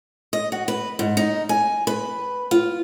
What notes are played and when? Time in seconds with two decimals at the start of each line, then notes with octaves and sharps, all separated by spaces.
0.33 D#5
0.52 F#4
0.68 B4
0.99 G#2
1.17 D#4
1.49 G#5
1.87 B4
2.51 F4